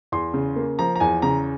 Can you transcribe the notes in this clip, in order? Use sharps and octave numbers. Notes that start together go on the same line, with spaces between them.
E2 C6
C#3
A#3
F3 A#5
A#5
E2 G#5
C#3 A#5